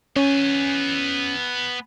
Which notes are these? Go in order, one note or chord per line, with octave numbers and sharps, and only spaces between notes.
B3 C#4 G#5